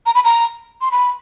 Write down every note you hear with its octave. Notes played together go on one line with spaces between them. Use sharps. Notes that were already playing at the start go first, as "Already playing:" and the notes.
A#5
B5
A#5
C6
B5